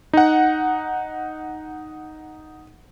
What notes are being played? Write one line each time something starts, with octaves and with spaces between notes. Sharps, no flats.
D#4 F#5